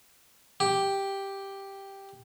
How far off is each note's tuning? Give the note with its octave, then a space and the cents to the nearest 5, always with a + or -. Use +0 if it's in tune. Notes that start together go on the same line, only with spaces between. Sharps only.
G4 +0